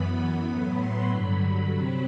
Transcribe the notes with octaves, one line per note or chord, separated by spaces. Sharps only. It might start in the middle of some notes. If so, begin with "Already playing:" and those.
Already playing: F#2 E3 B3 B5
B5
A2 F#3 B3 B5
C6
G2 D3 F#3 B5
B5
C3 F#3 C4